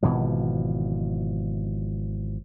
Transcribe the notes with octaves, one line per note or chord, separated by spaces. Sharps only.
G#1 B2 E3 F3